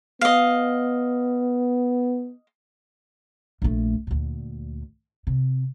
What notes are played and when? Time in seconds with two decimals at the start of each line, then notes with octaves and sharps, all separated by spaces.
0.21 B3 D#5 F5
3.62 A#1 A3
4.07 D2 A#2
5.27 C3